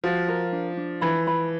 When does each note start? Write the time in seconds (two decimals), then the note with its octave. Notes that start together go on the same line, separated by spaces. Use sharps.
0.04 F3 F#4
0.28 A#4
0.52 D4
0.77 D4
1.01 E3 B5
1.27 B5